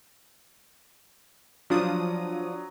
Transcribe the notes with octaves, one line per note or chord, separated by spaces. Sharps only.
F3 F#3 D4 D#6